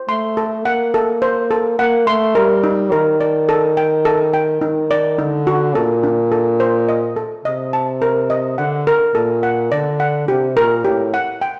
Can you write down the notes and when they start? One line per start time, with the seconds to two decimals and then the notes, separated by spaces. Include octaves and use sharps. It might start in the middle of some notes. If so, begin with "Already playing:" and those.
Already playing: C5
0.09 A3 C6
0.37 A4
0.65 A#3 F#5
0.94 A4
1.22 C5
1.51 A4
1.79 A#3 F#5
2.07 A3 C6
2.35 G3 A#4
2.64 D#4
2.92 D#3 A#4
3.21 D5
3.49 A4
3.77 G5
4.05 A4
4.34 G5
4.61 D#3 D#4
4.91 D5
5.18 D3 D#4
5.47 F#4
5.75 A#2 A4
6.03 D4
6.32 A4
6.60 C5
6.89 D#5
7.16 A4
7.45 C3 D#5
7.73 A5
8.02 A#4
8.30 D#5
8.58 D3 F#5
8.87 A#4
9.15 A#2 A4
9.43 F#5
9.71 D3 D5
10.00 F#5
10.28 C3 G4
10.56 A#2 A#4
10.85 A2 G4
11.14 F#5
11.41 G5